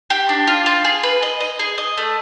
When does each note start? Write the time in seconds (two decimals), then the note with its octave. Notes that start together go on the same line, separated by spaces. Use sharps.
0.10 G4
0.29 D4
0.47 F4
0.66 F4
0.84 G#4
1.03 B4
1.22 D#5
1.40 D#5
1.59 G#4
1.78 D#5
1.97 A3